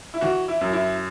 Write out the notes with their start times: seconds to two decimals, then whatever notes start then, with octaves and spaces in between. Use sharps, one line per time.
0.14 E4
0.21 E3 F#4
0.48 E4
0.61 F#2
0.73 E4